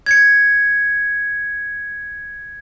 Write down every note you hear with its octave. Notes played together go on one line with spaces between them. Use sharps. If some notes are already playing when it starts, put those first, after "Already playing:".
G#6 C#7